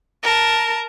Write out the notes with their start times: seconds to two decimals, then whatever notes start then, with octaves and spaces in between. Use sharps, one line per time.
0.23 A#4 A5